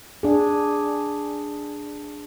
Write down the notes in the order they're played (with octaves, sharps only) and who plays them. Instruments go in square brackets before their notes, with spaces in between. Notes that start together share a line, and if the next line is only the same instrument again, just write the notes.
[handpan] D4 G#4